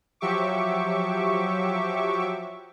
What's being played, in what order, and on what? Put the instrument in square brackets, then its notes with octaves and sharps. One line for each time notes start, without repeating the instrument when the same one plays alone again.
[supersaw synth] F3 F#3 G4 E5 C#6 D6